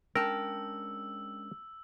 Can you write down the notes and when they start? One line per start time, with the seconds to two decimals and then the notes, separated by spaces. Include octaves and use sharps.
0.16 G#3 C#4 D4 A#4 G5 A5 E6